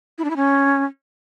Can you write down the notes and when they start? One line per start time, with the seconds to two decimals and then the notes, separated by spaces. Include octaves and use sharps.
0.18 E4
0.24 D4
0.30 E4
0.36 C#4